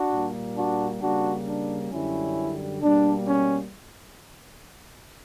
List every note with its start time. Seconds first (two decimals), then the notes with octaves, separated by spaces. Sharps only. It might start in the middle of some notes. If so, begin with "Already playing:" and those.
Already playing: D4 F#4
0.11 A#2 G3 A#3
0.56 D4 F#4
1.01 C#3 G3 A#3 D4 F#4
1.46 D4
1.91 F#2 D3 G3 C#4 E4
2.81 B2 G3 A#3 D4
3.27 C#4